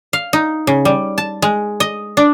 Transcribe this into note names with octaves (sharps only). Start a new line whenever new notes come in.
F5
D#4
C#3
G3
A5
G#3
D#5
D4